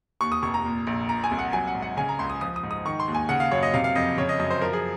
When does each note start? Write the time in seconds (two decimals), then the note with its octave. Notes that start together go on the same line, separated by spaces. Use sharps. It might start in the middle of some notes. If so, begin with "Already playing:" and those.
0.21 D#2 C#6
0.32 D#6
0.42 F1 C#6
0.54 A#5
0.64 A#2
0.87 A#1
1.09 A#2 A#5
1.24 G#5
1.31 C2
1.39 F#5
1.53 F#3 G#5
1.67 F#5
1.75 G#2
1.82 F#5
1.97 C#3 G#5
2.09 A#5
2.19 C#2 C6
2.30 D#6
2.41 F3 D#6
2.56 D#6
2.63 G#2
2.71 D#6
2.85 D#3 C#6
3.00 C6
3.08 D#2
3.15 G#5
3.29 C#3 F#5
3.40 F5
3.51 F#2 C#5
3.63 D#5
3.74 C3 F5
3.84 F5
3.96 F2 D#5
4.17 C#3 C#5
4.29 D#5
4.40 F#2 D#5
4.50 C5
4.61 F3 A#4
4.73 G#4